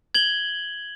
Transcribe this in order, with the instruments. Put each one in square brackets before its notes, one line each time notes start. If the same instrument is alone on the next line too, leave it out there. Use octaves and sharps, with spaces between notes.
[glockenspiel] G#6 F#7 G7